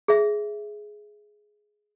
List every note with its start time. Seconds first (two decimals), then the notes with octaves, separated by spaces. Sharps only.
0.08 G#4 E5